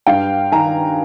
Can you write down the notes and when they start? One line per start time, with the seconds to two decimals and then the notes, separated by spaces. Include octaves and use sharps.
0.07 G2 F5 G5
0.52 D#3 G#5 A#5